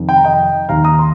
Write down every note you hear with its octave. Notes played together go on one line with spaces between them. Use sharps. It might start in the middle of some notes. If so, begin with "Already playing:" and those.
Already playing: F2 C3 D#3
G5
A#5
D#5 G5
D#2 D#3 F5 A#5
A#5 D#6
C6